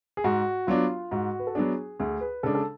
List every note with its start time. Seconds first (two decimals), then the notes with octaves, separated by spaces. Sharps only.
0.17 G#4
0.24 G#2 F#4
0.67 F#3 B3 D4 F4
1.11 G#2 F#4
1.39 B4
1.47 A4
1.55 F#3 B3 D4 G#4
1.99 D2 G#4
2.21 B4
2.43 C#3 G#3 D4 A4
2.55 A4